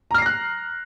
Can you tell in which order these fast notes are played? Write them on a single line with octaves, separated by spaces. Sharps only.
A#5 F6 C7 A#6 F#6